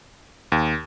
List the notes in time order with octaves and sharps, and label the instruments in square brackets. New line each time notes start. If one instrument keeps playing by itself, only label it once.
[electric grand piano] D#2